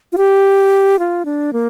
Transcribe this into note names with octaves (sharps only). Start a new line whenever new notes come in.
F4
G4
F4
D4
A#3